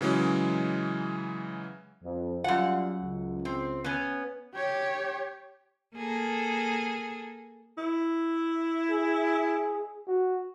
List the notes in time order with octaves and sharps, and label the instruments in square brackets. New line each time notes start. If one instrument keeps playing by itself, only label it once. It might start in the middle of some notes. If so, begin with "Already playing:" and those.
[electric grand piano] C#3 E3 F#3 G#3 C#4
[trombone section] F2
[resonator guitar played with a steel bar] F#2 F#5 [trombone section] G3 F4
[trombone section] C#2
[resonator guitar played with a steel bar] C4
B3 C#4
[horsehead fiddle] G4 C#5
[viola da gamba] A#3 G#4 A4
[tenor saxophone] E4
[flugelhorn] G#4
F#4